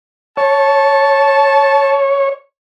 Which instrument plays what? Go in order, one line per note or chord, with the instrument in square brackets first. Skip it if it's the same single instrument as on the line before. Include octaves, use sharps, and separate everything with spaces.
[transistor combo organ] C#5 [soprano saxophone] A5